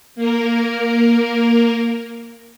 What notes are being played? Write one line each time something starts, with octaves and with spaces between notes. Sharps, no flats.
A#3 A#4